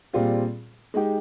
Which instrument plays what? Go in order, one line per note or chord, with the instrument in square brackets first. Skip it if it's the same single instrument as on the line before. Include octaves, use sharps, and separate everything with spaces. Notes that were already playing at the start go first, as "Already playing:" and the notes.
[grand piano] A#2 G3 C4 F4 G#4
G#3 D#4 G4